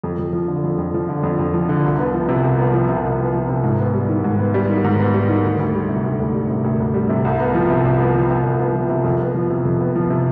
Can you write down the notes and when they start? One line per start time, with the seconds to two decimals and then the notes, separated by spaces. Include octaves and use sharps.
0.04 F2
0.19 F2
0.33 F3
0.48 D3
0.64 F2
0.78 F2
0.94 F3
1.09 D3
1.23 F2
1.39 F2
1.54 F3
1.69 D3
1.84 C2
1.99 B3
2.14 F3
2.29 C3
2.43 C2
2.59 B3
2.74 F3
2.89 C3
3.04 C2
3.19 B3
3.35 F3
3.49 C3
3.64 G#2
3.79 B3
3.94 G3
4.09 D#3
4.24 G#2
4.39 B3
4.54 G3
4.69 D#3
4.84 G#2
5.00 B3
5.14 G3
5.29 D#3
5.44 D2
5.59 D2
5.75 G3
5.89 C3
6.04 D2
6.20 D2
6.35 G3
6.49 C3
6.64 D2
6.80 D2
6.94 G3
7.09 C3
7.25 C2
7.39 B3
7.55 F3
7.70 C3
7.85 C2
8.00 B3
8.15 F3
8.30 C3
8.44 C2
8.60 B3
8.74 F3
8.89 C3
9.04 F2
9.20 B3
9.35 F3
9.50 C3
9.65 F2
9.80 B3
9.96 F3
10.10 C3